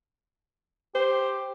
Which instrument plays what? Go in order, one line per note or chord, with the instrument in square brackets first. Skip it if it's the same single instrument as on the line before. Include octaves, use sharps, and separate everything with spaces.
[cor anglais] G4 [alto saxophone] C5